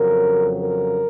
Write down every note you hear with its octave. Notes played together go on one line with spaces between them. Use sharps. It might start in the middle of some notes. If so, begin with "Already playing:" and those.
Already playing: F2 C#3 F#3 A#4
A#4